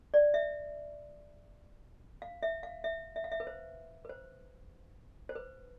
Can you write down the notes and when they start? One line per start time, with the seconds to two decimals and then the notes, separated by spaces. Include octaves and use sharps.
0.14 D5
0.34 E5
2.22 F5
2.43 E5
2.63 F5
2.84 E5
3.16 E5
3.24 F5
3.32 E5
3.40 B4
3.47 C5
4.05 B4
4.10 C5
5.29 C5
5.35 B4